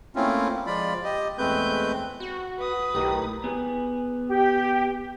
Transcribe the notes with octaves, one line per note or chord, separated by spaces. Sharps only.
A3 A#3 C4 C#4 E4 F4
F3 G#3 F4 D5 B5
G4 D#5
E2 G#3 A3 C4 B4 G6
F#4
B4 D#6
B1 A2 D#3 G4
B3 G#4
G4